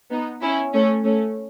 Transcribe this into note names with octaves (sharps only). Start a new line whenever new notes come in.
B3 D#4
C#4 E4
A3 C#4
A3 C#4